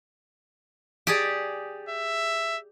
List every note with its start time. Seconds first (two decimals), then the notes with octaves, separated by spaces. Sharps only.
1.07 G4 G#4 D5
1.89 E5